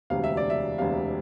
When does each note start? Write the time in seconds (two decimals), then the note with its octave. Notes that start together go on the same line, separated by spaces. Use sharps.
0.10 E1 D2 C3 F5
0.24 E5
0.37 D5
0.50 E5
0.78 E1 D2 C3 F5